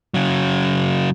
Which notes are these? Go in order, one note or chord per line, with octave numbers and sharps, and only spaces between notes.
C#3 F#3